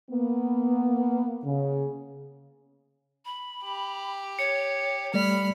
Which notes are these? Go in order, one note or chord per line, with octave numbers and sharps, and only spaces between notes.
A#3 B3
C#3
B5
G4
C#5 C#7
G3 A3 D5 B5 F6